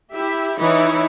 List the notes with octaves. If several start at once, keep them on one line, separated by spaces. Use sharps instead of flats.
E4 G4 E5
E3 D#4 E4 C#5